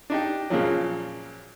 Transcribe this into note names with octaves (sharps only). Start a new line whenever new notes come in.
D4 D#4 G4
A#2 C#3 F3 F#3